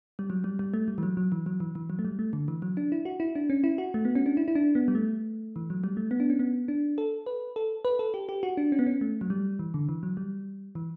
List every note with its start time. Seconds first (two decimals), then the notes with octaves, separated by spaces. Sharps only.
0.19 G3
0.30 F#3
0.44 G3
0.59 G3
0.74 A3
0.88 G3
0.98 E3
1.03 F#3
1.17 F#3
1.32 E3
1.46 F#3
1.60 E3
1.75 E3
1.90 F#3
1.99 A3
2.05 G3
2.19 A3
2.33 D3
2.48 E3
2.62 F#3
2.77 D4
2.92 E4
3.05 F#4
3.20 E4
3.35 D4
3.50 C#4
3.64 E4
3.78 F#4
3.94 A3
4.05 B3
4.15 C#4
4.26 D4
4.37 E4
4.48 E4
4.55 D4
4.75 B3
4.88 G3
4.95 A3
5.56 E3
5.70 F#3
5.84 G3
5.97 A3
6.11 B3
6.20 D4
6.30 C#4
6.39 B3
6.68 D4
6.98 A4
7.26 B4
7.56 A4
7.85 B4
7.99 A4
8.14 G4
8.29 G4
8.43 F#4
8.57 D4
8.72 C#4
8.79 B3
8.86 C#4
9.01 A3
9.21 F#3
9.30 G3
9.59 E3
9.74 D3
9.89 E3
10.03 F#3
10.17 G3
10.75 E3